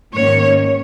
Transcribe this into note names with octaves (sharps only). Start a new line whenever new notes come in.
G#2 D#3 A#3 C#4 C#5